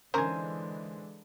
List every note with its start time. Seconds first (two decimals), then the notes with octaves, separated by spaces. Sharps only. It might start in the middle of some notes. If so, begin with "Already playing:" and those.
0.14 D3 E3 G#3 C#4 D#4 A#4 C5 G#5